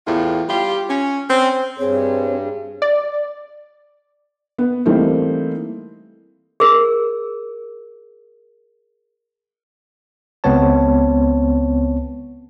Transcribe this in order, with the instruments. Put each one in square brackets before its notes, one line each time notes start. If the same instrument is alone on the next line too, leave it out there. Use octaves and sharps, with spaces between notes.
[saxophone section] E2 A2 F4 G4
G3 F4 G4
C#4
C4 C#4
[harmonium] G2 [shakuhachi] C4 [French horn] G#4 [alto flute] C#5
[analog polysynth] D5
[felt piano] B3
E3 G3 A3 A#3 C4 D#4
[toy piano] G#4 A#4
[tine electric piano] C#2 B3 C4 C#5 A5